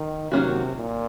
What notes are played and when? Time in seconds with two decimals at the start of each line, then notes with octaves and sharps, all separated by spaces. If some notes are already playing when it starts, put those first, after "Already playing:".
Already playing: D#3
0.31 C3 D#3 F#3 A#3 C#4 F#4
0.75 A#2